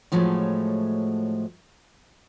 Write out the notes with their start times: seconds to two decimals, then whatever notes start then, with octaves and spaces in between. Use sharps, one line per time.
0.12 A2 F3 F#3 G#3 A3